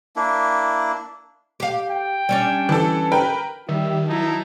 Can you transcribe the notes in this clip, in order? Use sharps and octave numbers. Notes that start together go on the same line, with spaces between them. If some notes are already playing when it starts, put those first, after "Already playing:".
A#3 D4 E4
G4 F5
G5
G3 C#4 D4
E3 A4
A#4 B4 G5
D#3 G3 G4 E5
F#3 D#4 E4 A5